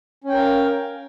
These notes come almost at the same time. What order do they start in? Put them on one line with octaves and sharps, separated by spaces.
C#4 G5 A#4 F5